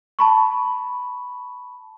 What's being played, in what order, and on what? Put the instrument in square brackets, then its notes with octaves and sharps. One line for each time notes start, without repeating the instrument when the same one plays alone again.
[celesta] A5 B5 C#6